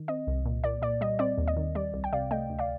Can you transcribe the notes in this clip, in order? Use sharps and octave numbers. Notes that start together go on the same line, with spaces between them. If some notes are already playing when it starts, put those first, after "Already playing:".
Already playing: D#3
C4 D#5
C2
A#2
A#2 D5
A#2 D5
G3 D#5
C4 D5
D#2
D#5
D#3
G3 D5
C2
G5
C3 D5 F5
A3 D#5 G5
D2
D5 F5